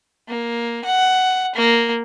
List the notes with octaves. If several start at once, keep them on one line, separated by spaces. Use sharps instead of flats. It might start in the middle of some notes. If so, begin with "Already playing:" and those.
A#3
F#5
A#3